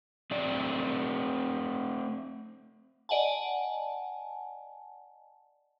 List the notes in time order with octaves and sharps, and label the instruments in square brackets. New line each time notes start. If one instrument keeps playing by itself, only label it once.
[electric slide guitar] A3 C4 D5
[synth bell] D5 D#5 F#5 G#5 A5